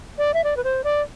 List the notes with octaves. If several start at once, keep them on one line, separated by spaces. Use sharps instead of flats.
D5
E5
D5
B4
C5
D5